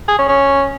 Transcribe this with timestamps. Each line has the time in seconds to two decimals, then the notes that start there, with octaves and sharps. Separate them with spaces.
0.08 G#4
0.18 C#4
0.28 C#4